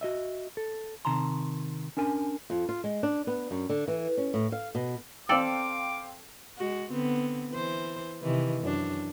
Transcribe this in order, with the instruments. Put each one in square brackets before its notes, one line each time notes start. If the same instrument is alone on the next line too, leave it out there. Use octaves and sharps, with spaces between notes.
[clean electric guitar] F#4 D#5 E5
A4
C3 D#3 A5 A#5 C6
C#4 D4 A#4 G#5
[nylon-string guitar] F2
F4
G#3
D4
B3
F#2
D3
E3
C#4
A2
F5
B2
[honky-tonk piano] C4 F5 G5 [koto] A4 D5 [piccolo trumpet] D6
[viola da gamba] G#3 F#4
D3 B3 C4
E3 C5
C3 D#3 E3
F#2 D4